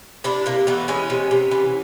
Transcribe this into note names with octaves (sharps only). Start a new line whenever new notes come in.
C3 D4 E4
C3 A#3
E3 A3 B3
G#3 B3 C#4
C3
C3
E3